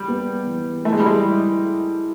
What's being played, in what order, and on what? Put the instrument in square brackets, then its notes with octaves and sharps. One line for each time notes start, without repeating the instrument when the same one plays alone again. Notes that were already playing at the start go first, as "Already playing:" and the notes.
Already playing: [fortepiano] G3
[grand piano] B3
E3
[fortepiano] A3 [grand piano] E4
[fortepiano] G#3
G3
G#3
[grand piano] E4
E4